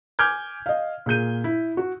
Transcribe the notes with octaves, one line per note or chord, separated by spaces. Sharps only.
G#5 D6 F6 G6 G#6
D#5 F5
A#2 G#4 G6 D#7
E4
F#4